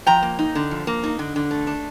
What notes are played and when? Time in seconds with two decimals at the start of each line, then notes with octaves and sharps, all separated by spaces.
0.06 F3 G5 A#5
0.23 A#3
0.39 D#4
0.55 D3
0.71 F3
0.87 A#3
1.04 D#4
1.19 D3
1.36 D3
1.51 A3
1.67 D4